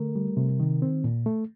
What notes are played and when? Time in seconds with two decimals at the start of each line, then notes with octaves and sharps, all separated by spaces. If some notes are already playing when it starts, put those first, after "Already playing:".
Already playing: D3 A3 A#4
0.16 G3
0.37 C3
0.60 D#3
0.82 C4
1.04 A#2
1.26 A3